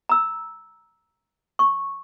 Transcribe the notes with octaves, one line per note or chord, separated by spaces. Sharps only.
A#5 E6
C#6